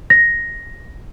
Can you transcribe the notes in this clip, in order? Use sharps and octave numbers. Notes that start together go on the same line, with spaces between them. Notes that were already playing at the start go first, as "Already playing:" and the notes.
A#6